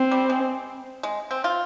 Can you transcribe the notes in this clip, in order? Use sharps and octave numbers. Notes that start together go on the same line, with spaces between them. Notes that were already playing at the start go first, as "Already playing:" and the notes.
Already playing: C4
G3
G#3
G#3
C4
F4